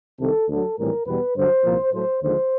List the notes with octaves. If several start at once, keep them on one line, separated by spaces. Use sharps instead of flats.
C2 C3 D#3 A4
D2 D3 F#3 A4
A#1 A2 E3 G3 C4 A#4
E2 B2 G3 B3 B4
G2 D3 F#3 C5
C2 A#2 F3 A#3
A2 F#3 A3 C5
D#2 D3 F3 G#3 C5